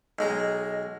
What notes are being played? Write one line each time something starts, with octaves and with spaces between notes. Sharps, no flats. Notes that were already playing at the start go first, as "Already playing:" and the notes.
B1 G#3 D#5 A#5